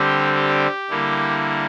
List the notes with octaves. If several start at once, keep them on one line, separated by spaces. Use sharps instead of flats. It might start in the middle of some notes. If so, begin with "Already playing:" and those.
Already playing: D3 G3 C4 G4
G4
D3 G3 A#3 E4